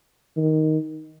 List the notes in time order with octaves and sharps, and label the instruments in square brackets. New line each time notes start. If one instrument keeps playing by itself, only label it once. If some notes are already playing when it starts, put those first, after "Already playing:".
[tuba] D#3